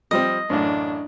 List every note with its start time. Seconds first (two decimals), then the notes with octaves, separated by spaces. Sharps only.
0.11 F3 G3 C4 D#5
0.50 A1 F#2 D4